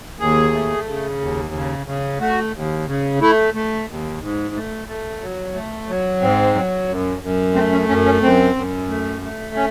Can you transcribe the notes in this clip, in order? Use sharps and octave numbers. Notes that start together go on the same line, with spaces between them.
D#2 G#4
A3
C#3
D#2
C#3
C#3
A3 F#4
D#2
C#3
A3 E4
A3
D#2
G#2
A3
A3
F#3
A3
F#3
G#2 C4
F#3
F#2
F#2
A3 C4
C#4
F#2 C#4
C#4
F#2 C4
F#2
A3
A3
C#4